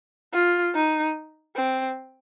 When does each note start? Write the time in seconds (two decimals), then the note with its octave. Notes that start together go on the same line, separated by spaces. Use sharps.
0.34 F4
0.75 D#4
1.56 C4